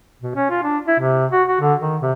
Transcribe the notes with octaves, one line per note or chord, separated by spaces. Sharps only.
B2
C#4
F4
D4
E4
C3
F#4
F#4
D3
D#3
C3